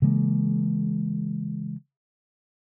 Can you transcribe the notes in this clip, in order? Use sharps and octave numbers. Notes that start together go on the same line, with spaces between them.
C#3 E3 G#3 A#3